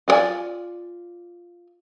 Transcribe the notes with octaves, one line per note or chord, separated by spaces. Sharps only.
F4 F#4 G#4 D5 G#5